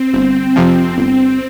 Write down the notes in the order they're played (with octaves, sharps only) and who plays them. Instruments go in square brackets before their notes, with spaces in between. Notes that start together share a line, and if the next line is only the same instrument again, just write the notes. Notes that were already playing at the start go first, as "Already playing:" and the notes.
Already playing: [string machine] C4
[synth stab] G1
F2 C3 F3
[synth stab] G1 [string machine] C4